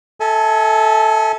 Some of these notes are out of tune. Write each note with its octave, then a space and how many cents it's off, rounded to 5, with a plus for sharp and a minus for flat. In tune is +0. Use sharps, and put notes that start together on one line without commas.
A4 +0 E5 -30 G#5 +25